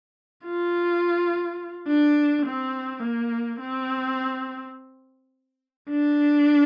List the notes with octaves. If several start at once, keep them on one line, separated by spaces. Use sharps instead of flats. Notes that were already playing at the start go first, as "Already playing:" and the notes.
F4
D4
C4
A#3
C4
D4